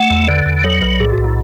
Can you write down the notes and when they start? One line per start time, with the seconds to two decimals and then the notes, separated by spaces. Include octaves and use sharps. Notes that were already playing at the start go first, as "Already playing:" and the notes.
Already playing: A3 F#5
0.10 E2
0.28 D3 B4 D5
0.46 E2
0.64 F#3 A4 C#5
0.82 B1 B4
1.00 A2 G#4
1.12 F#4
1.18 B1
1.24 E4